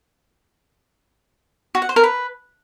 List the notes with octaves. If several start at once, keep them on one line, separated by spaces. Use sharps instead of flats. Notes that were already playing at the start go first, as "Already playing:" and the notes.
F#4
F#5
C5
A#4
B4